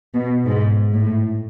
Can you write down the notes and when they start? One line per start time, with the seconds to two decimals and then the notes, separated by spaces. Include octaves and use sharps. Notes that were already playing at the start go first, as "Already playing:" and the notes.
0.15 B2
0.46 G#2
0.93 A2